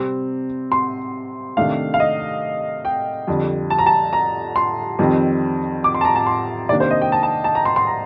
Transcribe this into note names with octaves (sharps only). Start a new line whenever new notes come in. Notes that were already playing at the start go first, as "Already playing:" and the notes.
Already playing: C3 G3 C4
C6
C3 D#3 A3 D4 F5
F5
D#5
G5
F2 D3 G3
A5
A#5
A5
A#5
C6
F2 D#3 G3 C4
D6
C6
A5
A#5
A5
C6
C3 D#3 A#3 D4 D5
C5
D#5
G5
A5
A5
A5
A#5
C6
C6
A#5